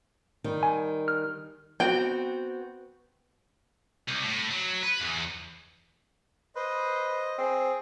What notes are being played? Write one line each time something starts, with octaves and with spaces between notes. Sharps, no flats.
D#3 G3
G#5
F6
B3 C4 F#4 G5
C2
A2
F#3
B4
E2
B4 C5 D#5
C4 G#4